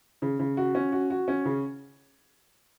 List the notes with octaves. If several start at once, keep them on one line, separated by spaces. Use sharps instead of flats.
C#3
C#3
F#4
C#4
F#4
F#4
C#4
C#3